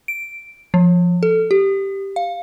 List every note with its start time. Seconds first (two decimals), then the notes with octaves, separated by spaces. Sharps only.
0.08 D7
0.74 F3
1.23 A4
1.51 G4
2.16 F5